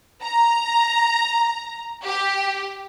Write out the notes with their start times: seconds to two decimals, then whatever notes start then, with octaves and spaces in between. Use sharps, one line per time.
0.22 A#5
2.05 G4